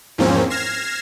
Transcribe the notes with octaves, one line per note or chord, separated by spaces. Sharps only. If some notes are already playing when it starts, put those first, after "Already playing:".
E2 G#2 F3 A#3 C4 C#4
F6 G#6 A#6 C7 E7